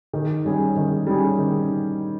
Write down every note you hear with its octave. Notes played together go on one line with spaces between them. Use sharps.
D#3
G3 C#4 G#4
D#3
G3 C#4 G#4
D#3